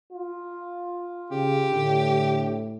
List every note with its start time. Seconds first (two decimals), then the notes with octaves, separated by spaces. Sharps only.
0.12 F4
1.31 C#3 G4
1.71 A2 D3